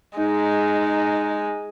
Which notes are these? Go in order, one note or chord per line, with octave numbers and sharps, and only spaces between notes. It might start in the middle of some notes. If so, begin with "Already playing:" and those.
G#3 D#4